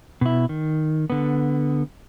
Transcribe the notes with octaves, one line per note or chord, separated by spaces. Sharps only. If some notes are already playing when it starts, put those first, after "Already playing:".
B2 E4
D#3
D3 B3